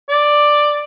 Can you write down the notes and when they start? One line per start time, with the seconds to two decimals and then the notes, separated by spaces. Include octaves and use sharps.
0.09 D5